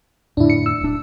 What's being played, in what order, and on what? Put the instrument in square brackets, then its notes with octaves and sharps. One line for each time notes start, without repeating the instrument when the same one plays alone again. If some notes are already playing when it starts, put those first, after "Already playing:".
[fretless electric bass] F2 A2 D3 [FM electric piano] D4 E4
[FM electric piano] C#7
E6
[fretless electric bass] D1 D4